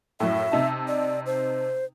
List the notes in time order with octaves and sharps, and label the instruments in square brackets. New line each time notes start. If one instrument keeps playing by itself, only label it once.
[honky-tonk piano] F#2 A2 [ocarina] E5
[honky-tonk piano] C3 D#4 A5
[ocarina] D5
C5